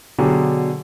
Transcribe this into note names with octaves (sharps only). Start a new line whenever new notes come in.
B2 D3 F#3 D4 G4 G#4